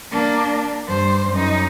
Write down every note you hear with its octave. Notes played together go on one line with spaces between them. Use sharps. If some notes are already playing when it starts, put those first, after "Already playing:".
A#3 D4
G2 C5
F#2 D#4